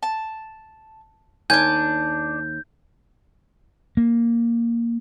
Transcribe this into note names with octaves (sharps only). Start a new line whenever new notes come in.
A5
D#2 D4 D5 G#5 G6
A#3